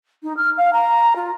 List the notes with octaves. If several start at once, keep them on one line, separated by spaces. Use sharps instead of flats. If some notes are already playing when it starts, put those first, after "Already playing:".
D#4
F6
F5
A#5
F4